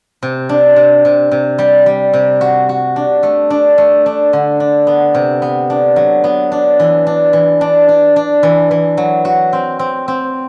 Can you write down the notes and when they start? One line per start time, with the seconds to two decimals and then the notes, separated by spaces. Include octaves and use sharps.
0.23 C3
0.49 D4
0.76 C3
1.05 C3
1.31 C3
1.58 G3
1.86 G3
2.13 C3
2.41 F#4
2.69 F#4
2.96 D4
3.23 A3
3.50 D4
3.78 A3
4.06 D4
4.33 D3
4.60 D4
4.87 B3
5.15 C3
5.42 B3
5.70 D4
5.96 F#3
6.24 B3
6.52 D4
6.80 E3
7.07 D4
7.33 E3
7.61 D4
7.89 D4
8.16 D4
8.43 E3
8.71 E3
8.97 F#3
9.25 F#4
9.53 C4
9.79 C4
10.08 C4